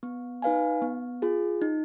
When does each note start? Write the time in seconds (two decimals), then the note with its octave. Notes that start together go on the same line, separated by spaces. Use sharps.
0.03 B3
0.42 D#4 B4 F5 G#5
0.82 B3
1.22 F4 G#4
1.62 D#4